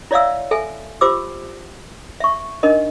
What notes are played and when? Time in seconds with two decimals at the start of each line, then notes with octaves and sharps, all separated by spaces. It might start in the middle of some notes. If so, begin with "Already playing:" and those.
0.11 E4 C#5 D5 E5 F5 E6
0.51 A4 E5 G#5
1.01 F4 G4 C5 D6 E6
2.20 E5 C#6
2.63 D4 D#4 A#4 D#5